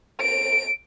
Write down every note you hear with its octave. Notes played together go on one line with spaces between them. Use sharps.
D7